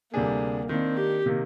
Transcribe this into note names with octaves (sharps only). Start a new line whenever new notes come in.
D2 C3 G3 A#3 D4 G#4
D#3 A#3 C4 D4
G4
C3 D#3 A#3